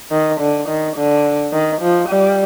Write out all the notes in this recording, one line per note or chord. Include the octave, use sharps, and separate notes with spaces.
D#3
D3
D#3
D3
D#3
F3
G3